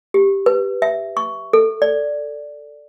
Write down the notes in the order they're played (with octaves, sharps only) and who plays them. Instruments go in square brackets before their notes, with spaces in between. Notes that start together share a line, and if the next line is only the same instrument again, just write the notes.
[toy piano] G4
B4
E5
C#6
A4
D5